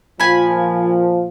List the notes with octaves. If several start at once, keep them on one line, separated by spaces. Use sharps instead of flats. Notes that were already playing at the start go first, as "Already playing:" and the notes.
A#2 F3 G#5 B5